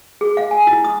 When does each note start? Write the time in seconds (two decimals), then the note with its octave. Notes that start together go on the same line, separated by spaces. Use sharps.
0.21 G#4
0.37 F5
0.51 G#5
0.67 E4
0.84 D#6